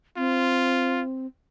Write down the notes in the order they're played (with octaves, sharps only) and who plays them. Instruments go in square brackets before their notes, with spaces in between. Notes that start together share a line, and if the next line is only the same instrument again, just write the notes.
[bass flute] C4 [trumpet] F4